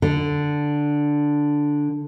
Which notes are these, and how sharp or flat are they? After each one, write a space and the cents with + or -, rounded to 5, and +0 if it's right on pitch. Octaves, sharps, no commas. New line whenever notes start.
D3 +0 A4 +0